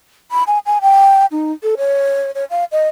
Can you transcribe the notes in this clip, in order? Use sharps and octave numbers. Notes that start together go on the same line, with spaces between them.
B5
G#5
G#5
G5
D#4
A4
C#5
C#5
F5
D#5